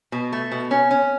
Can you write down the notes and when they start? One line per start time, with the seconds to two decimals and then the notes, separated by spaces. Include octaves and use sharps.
0.12 B2
0.33 A3
0.52 B2
0.71 C#4
0.91 C#4